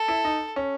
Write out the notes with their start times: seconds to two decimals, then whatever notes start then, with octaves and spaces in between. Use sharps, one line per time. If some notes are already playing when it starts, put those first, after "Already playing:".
Already playing: A4
0.08 E4
0.24 D#4
0.56 C#4